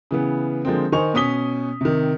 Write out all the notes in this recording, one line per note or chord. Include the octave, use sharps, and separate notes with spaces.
C#3 E3 B3
D3 F3 G#3 A#3 C4
D#3 D#4 C5 G#5 C#6 F7
B2 C#4 D#6 B6 G7
C3 D#3